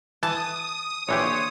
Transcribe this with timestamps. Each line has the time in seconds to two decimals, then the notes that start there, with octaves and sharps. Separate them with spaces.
0.23 E3 A5 D#6
1.09 A#1 D3 E3 G4 C5 C#5